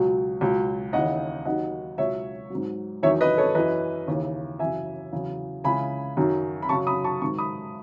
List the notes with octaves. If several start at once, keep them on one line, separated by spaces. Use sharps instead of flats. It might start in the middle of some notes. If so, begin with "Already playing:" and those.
Already playing: C#2 B2 F#3
C#2 B2 F#3
D#2 C#3 E3 D#5 F#5
D#2 D#3 F#3 D#5 F#5
C#2 B2 F#3 C#5 E5
G#2 F#3
E2 D#3 F#3 C#5 E5
B4 D#5
A4 C#5
F#2 E3 B4 D#5
D#2 C#3 E3
F#2 C#3 E3 E5 G#5
E2 C#3 F#3
C#2 C#3 E3 G#5 B5
F#2 D#3 F#3
B5
F#2 C#3 F#3 A5 C#6
B5 D#6
A5 C#6
G#2 D#3 F#3 A5 C#6
B5 D#6